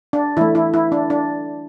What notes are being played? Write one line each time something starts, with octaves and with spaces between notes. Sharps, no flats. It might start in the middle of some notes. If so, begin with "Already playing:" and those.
D4
E3 A3 E4
E4
E4
D4
D4